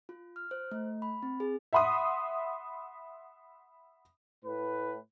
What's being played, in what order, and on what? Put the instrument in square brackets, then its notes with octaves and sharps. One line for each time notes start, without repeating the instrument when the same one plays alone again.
[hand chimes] F4
F6
C5
A3
B5
C4
G#4
[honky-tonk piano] E5 F#5 B5 C6 D#6
[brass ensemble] A2 B4